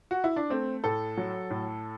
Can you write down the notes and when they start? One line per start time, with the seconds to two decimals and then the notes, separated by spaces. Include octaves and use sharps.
0.11 F#4
0.24 E4
0.36 D4
0.50 A3 C4
0.84 A2 A4
1.17 F#3
1.50 A2